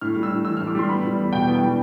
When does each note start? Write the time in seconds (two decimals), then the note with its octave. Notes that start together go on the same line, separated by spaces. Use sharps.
0.01 A2 F6
0.16 G3
0.23 E6
0.30 A2
0.45 E3 E6
0.57 F6
0.60 A2
0.67 D6
0.75 G3 C6
0.89 B3 B5
1.03 G3
1.18 E2
1.33 B2 G5
1.47 B3
1.55 G5
1.63 G3